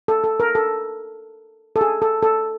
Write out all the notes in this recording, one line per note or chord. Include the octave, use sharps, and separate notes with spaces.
A4
A4
A#4
A4
A4
G#4
A4
A4